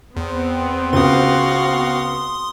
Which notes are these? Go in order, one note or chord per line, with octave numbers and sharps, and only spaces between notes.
E2 B3 C4
C#2 F#4 F5 C6 D#6